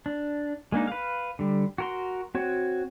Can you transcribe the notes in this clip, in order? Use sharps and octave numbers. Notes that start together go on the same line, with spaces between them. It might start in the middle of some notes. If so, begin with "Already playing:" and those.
D4
G#3 A#3 D4 D#4
B4 F5
D3 G3
F#4 A#4 C6
C4 F#4 C#5